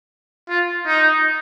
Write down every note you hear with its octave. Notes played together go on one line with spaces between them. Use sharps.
F4
D#4